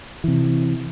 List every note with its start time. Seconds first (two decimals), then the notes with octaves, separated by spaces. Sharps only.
0.24 C3 E3